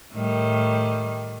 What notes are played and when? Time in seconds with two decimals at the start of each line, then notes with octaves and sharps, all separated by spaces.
0.12 A2 D#3 G3